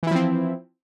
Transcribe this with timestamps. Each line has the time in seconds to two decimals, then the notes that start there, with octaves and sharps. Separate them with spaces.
0.03 E3
0.07 E4
0.11 F3
0.15 C4